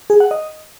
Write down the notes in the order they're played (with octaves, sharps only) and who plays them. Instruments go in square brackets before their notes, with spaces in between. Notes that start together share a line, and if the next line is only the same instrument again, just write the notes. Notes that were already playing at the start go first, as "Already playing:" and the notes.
[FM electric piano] G#4
F#5
D#5